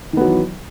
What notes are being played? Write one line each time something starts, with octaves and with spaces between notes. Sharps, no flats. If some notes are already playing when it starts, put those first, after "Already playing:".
D#3 E3 F#3 B3